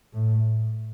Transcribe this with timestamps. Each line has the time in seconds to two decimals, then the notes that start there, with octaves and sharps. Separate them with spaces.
0.13 A2